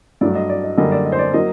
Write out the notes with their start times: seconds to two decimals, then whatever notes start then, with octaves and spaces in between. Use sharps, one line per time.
0.21 G2 F#3 A3 D5
0.35 D#5
0.49 D5
0.63 D#5
0.77 F#2 D3 G3 A#3 D#5
0.92 D5
1.05 D#5
1.12 C5
1.19 D5
1.34 F#3 A#3 D#5